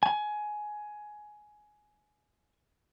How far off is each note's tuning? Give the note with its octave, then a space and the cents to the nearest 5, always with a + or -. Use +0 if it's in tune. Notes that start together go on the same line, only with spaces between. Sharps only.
G#5 +15